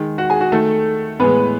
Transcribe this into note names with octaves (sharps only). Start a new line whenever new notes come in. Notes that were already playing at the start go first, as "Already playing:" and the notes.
Already playing: D#3 G#3
F#4 F#5
G#4 G#5
F#4 F#5
D#3 A3 A4
A2 E3 G#3 B3 B4